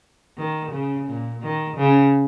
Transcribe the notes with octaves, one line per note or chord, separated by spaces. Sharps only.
D#3
C#3
A#2
D#3
C#3